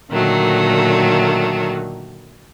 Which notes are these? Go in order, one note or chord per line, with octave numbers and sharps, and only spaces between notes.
A#2 D3 D#3 F#3 A3